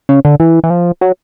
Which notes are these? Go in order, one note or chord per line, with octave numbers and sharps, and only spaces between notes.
C#3
D3
E3
E3
F3
F#3